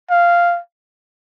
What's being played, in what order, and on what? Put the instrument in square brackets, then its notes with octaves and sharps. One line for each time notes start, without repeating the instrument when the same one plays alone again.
[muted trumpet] F5